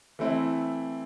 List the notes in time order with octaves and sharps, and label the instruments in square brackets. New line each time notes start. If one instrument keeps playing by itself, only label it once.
[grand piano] E3 A3 C4 E4